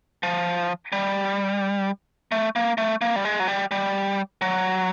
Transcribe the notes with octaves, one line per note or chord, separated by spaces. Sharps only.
F3
G3
A3
A#3
A3
A#3
G3
G#3
F#3
G3
G3
F#3